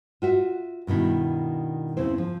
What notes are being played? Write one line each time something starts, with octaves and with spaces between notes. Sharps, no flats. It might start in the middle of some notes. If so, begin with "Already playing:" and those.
F4 F#4 E5
G2 B2 D#3 E4
E2 C#3 C4 E4 C5
F3